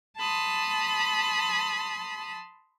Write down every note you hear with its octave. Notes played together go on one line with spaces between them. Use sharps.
A5 B5 C6 D#6